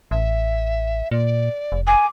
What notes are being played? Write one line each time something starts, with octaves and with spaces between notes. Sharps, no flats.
A1 E5
A#2 D5
F1
G#5 D6